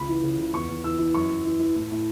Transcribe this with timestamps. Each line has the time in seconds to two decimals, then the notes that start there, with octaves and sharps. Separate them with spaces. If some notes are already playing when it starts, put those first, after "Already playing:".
Already playing: C#2 B5
0.08 E3
0.23 C#3
0.38 C#2
0.53 E2 C#6
0.69 E2
0.84 E3 E6
0.99 E3
1.14 F#2 C#6
1.29 F#2
1.45 E3
1.59 E3
1.75 A2
1.91 A2